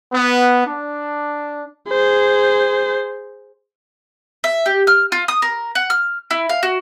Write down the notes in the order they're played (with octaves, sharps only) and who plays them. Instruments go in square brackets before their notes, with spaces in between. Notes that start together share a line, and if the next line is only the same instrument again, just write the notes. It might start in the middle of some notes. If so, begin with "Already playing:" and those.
[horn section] B3
D4
[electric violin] G#4 C5
[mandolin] E5
G4
F6
F4
D#6
A#4
F#5
F6
E4
F5
F#4